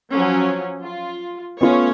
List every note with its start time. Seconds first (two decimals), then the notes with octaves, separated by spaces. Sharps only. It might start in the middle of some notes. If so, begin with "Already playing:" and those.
0.13 F3 F#3 C#4
0.81 F4
1.61 A3 B3 C#4 F4 C#5